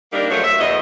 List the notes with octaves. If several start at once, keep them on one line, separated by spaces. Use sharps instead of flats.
D#3 G3 A#3 D4 D#4 A#4
F3 F#3 G#3 A3 C5 C#5
E5
E2 D#5